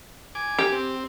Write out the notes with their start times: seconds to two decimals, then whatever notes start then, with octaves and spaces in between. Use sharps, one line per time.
0.35 G#5 D6
0.59 G4
0.72 C4